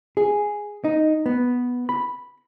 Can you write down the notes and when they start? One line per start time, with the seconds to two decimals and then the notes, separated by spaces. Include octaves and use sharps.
0.17 G#4
0.84 D#4
1.26 B3
1.89 B5